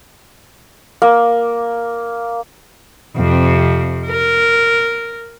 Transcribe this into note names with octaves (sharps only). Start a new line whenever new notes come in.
A#3
F2 C3
A#4